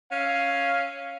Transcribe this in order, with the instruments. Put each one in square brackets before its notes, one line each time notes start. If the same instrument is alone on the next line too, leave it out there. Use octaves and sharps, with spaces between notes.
[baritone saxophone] C#4 [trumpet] F5